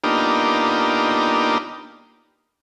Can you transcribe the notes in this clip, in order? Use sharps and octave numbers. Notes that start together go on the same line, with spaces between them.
A#3 B3 D4 D#4 F4 G4